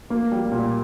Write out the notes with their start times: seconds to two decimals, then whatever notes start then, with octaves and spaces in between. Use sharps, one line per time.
0.10 A#3
0.32 G3
0.52 A#2